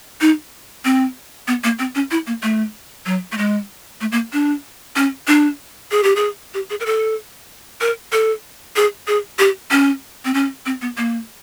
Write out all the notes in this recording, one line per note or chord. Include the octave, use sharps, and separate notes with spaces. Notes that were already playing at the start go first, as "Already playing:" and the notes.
D#4
C4
B3
A#3
C4
C#4
E4
A#3
A3
F#3
A3
G#3
A3
A#3
D4
C#4
D4
G#4
G4
G#4
G4
G#4
A#4
A4
A#4
A4
G#4
G#4
G4
C#4
C4
C#4
C4
B3
A#3